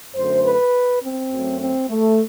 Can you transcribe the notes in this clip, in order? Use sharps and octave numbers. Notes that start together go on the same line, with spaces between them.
F#2 D3 A3 C5
B4
C4
F#2 F#3 A3
C4
A3